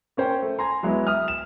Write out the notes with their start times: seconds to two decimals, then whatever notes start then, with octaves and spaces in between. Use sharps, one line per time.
0.17 A#3 C#4 C5 G5
0.42 A3
0.59 G#5 A#5 C6
0.83 F#3 G#3 B3 E4
1.07 E5 D#6 F6
1.28 E7